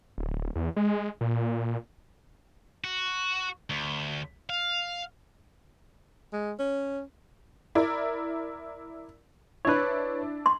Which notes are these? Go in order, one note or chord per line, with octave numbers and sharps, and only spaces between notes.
D1
E2
G#3
A#2
F#4
D2
F5
G#3
C#4
E4 A#4 D5
D4 E4 B4 C#5
C6